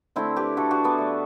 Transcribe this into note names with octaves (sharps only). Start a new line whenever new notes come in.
D3 A3 C4 E4
G4 B4
D3 A3 F#4 A4
D4 F#4
B3 D4
D3 A3